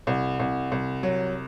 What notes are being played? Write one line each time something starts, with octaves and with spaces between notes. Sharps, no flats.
C2
C2
C2
F#3